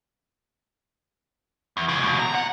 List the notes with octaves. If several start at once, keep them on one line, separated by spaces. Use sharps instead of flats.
E2
C#2 C#3
D#2 B2
A#5
F#5